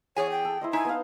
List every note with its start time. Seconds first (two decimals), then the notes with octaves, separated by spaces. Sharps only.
0.16 E2 G#4 C#5 G#5
0.30 G5
0.45 A4
0.61 E4 C5 D#5
0.73 D#4 E4 G#5
0.85 B3 F5